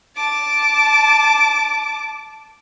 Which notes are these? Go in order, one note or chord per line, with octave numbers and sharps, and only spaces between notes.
A5 D6